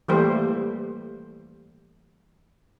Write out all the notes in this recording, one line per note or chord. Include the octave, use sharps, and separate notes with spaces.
E3 G3 A3 A#3 G4 C5